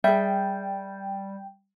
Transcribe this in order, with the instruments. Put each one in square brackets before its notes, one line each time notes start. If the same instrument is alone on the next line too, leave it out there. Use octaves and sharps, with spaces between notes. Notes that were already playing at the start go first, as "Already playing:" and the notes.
[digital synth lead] G3 [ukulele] G#4 E5 [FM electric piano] G5